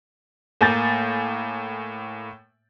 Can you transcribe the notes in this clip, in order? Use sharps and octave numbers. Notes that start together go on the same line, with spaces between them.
A2 A#3 G#5 G6 A6